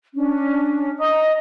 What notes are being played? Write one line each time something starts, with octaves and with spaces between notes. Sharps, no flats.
C#4 D4
D#5 A#5 D#6